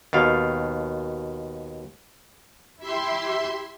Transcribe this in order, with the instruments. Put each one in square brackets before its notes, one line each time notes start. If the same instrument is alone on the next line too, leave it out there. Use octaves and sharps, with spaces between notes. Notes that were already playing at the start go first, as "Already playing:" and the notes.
[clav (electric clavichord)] D#2 B2 F5
[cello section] E4 G4 [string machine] E5 C6